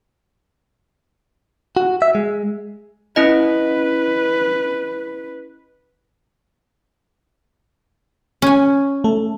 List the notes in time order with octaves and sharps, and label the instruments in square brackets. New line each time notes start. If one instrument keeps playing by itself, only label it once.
[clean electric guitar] F#4
E5
G#3
[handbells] C#4 E4 D#5 [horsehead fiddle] B4
[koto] C#4 G#5
[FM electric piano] A3 A4